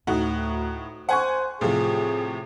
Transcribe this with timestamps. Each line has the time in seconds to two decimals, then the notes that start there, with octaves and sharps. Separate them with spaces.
0.07 D2 A2 D#4 F#4
1.09 C5 F#5 G#5 C#6
1.61 A2 C3 F3 G#4